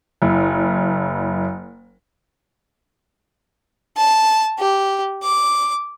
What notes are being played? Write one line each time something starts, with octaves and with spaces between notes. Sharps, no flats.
F#1 E4
A5
G4
D6